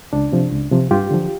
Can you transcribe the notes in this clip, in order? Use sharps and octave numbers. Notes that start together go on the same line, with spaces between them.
C#2 D4
C3 F3
C#2
C3 F3
G2 F4 G4
D3 F3